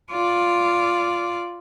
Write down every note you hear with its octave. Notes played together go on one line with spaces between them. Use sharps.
F4 D5